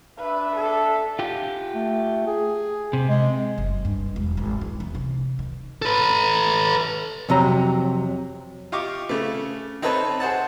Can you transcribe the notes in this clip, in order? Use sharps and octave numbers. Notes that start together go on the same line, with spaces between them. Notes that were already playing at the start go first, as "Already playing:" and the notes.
D4 B4 E5
A4
F4 G4
A3
G#4
C3
G#3
F#1
G2
E1
G#1
E3
E2
C3
D#3
A4 B4
F2 C3 F#3 A#5
F4 G4 D#5 C#6 D6
C#3 A3
C4 D#4 A4 B4 C#5 A5
G#4 C5 F#5 A5